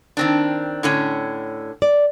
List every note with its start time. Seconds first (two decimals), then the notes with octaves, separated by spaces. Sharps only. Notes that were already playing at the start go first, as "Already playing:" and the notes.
0.17 D#3 C4 D4
0.83 A2 D3 C#4
1.82 D5